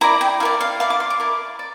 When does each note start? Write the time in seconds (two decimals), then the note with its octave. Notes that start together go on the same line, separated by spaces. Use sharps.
0.01 E4 A#4 D5 A#5
0.21 G5
0.40 E4 A#4 D5 F5
0.61 F5
0.80 E4 A#4 D5 F5
0.90 D6
1.00 C6
1.10 D6
1.20 E4 A#4 D5
1.59 D5